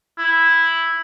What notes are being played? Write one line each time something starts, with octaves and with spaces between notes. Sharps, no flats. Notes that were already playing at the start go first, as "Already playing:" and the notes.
E4